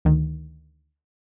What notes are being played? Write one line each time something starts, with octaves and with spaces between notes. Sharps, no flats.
D2 D#3